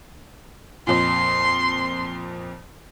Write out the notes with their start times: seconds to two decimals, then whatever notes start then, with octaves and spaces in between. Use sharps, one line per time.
0.87 F2 A#2 C6